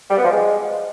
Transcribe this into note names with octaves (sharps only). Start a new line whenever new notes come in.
G3
B3
F3
G#3